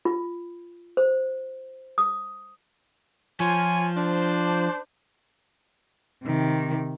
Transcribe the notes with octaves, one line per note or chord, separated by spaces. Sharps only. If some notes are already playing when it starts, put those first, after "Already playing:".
F4
C5
D#6
F3 F4 C#5 G#5
D4 C5
C3 D#3